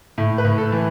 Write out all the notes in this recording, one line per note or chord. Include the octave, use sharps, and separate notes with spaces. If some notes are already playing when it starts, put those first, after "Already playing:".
A2
B4
A2
A4
E3